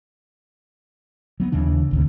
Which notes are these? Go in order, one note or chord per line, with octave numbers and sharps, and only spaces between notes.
F#3 B3
D#2 C#3 E3 D4
G#1 D2 C3